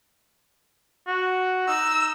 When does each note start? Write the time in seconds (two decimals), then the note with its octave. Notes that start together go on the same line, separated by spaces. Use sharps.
1.07 F#4
1.68 D#4 E6